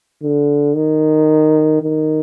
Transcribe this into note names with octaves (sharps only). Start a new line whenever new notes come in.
D3
D#3
D#3